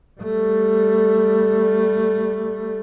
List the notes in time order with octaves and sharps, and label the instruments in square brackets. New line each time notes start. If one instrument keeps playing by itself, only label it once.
[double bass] G3 A3